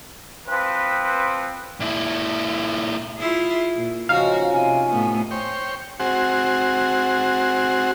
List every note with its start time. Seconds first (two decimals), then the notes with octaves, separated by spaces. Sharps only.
0.48 F3 C4 B4
1.80 A#2 E4
3.18 E4 F4 G#4
3.76 A#2
4.09 C#3 F3 C#4 D#4 F#4 F5
4.52 C3 G#5
4.90 A2 A3 B3
5.31 C5 C#5 G5
6.00 C4 F#4 G#4 C5 F#5